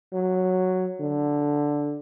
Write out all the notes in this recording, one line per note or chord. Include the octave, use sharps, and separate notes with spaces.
F#3
D3